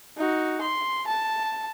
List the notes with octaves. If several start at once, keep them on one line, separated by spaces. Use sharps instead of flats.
D#4 F#4
C6
A5